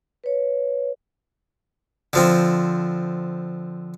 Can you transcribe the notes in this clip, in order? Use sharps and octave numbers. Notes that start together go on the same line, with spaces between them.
B4 C#5
D3 F3 C4